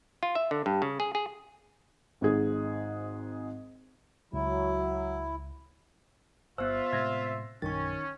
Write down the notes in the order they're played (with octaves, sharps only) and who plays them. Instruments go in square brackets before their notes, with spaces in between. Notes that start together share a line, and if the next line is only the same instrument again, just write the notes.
[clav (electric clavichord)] F4
E5
D3
G2
C#3
G#4
G#4
[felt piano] G#1 G#2 G#4
[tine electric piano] C#2 [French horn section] F#3 [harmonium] E4
[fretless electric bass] G1 [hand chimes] B3 C5 [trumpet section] F4 E5 [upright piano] E6 F#6
[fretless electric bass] A2 C3 G#3 [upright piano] G#6 A#6 C7
[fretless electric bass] A#1 F#2 [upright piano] D#3 [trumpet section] C#4 [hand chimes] C#6 A6